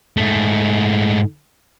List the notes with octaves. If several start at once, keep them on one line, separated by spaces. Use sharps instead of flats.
G#2 A3